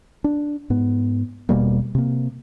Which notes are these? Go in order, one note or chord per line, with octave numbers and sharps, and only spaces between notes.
D4
G#2 B3
E1 B2 G3 A#3
C3 A#3